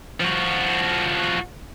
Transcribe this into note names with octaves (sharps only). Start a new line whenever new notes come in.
F3 F#4